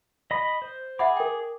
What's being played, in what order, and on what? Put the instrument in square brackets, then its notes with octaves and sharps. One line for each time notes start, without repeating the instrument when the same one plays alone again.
[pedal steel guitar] D#5 B5 D#6
C5
[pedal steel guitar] G#4 D6 [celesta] E5 F#5 B5
[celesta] A#4 G5